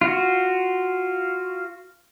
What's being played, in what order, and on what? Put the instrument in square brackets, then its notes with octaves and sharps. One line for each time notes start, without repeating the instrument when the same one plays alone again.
[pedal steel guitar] F4 F#4